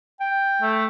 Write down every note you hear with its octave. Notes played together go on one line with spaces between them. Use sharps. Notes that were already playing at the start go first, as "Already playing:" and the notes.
G5
A3